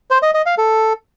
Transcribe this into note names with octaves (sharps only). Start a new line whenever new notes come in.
C5
D#5
D#5
F5
A4